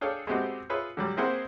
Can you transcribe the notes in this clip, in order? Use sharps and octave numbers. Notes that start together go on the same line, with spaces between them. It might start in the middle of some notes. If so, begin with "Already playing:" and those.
D4 G#4 A4 C#5 F5 G5
G#3 A3 B3 C4 F#4 G4
F4 G#4 B4 C#5 E5
D3 F#3 G3
A#3 C4 E4 G#4 C5 F#5